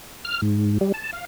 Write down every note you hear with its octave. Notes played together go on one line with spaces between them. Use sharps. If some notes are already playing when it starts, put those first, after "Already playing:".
F6
G#2
G3
A5
F5